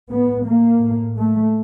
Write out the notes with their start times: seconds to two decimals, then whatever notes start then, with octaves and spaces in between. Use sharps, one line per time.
0.13 A2 B3
0.48 A#3
0.82 A2
1.16 A3